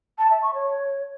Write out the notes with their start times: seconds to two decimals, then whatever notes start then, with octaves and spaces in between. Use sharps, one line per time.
0.18 A5
0.30 E5
0.42 C#6
0.54 C#5